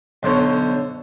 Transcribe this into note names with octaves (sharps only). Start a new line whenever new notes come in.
B1 D3 C5 C#5